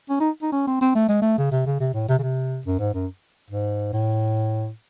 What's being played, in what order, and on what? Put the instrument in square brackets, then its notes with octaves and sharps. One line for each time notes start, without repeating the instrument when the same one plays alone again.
[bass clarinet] C#4
D#4
D#4
C#4
C4
C4
A3
G#3
A3
C#3
C3
C#3
C3
A2
C3
C#3
C3
F#2
G#2
F#2
G#2
A2